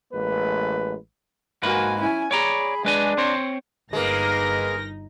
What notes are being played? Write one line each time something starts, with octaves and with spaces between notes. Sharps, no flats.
A1 G#3 A#3 B4
G#2 A#3 F#4 A#4 B4 G#5
C#4 E4 G#5
G#4 C#5 D5 A#5 B5
G#3 D4 B4 G#5
C4 C5 C#5
G1 G#3 A#3 D#4 A#4 B4 A#6